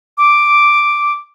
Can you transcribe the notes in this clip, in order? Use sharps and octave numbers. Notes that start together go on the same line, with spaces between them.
D6